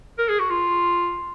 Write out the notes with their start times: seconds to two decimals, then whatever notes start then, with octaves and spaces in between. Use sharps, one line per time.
0.18 A#4
0.29 G#4
0.39 F#4
0.50 F4